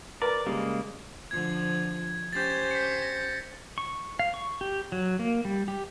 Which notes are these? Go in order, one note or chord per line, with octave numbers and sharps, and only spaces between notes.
A#4 B4 D5
C#3 G3 G#3 A#3
D3 F3 G#6
C#4 G4 C5 G6 A6
B6 C#7
A#6
C#6
F5
C#6
G4
F#3
A#3
G3
G4